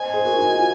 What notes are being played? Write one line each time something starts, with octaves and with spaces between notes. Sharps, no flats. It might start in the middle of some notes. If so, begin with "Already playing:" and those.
Already playing: C5 D#5 G#5
G#4 C5
F#4 A#4
D#4 F#4
F4